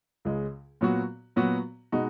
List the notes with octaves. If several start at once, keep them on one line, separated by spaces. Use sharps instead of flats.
C#2 C#3 G#3
A#2 F#3 B3 F#4
A#2 F#3 B3 F#4
B2 G#3 D#4 F#4